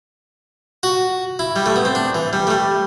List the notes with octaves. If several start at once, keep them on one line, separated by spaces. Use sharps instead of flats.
F#4
E4
G3
A3
B3
C4
D4
E3
G3
A3
G3